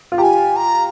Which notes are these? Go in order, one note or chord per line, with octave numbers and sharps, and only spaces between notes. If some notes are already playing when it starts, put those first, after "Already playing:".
F4
G4 G#5 A#5
A#5